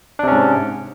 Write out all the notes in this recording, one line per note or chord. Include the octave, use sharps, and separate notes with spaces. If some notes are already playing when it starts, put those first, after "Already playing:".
G#2 C3 C#4 D4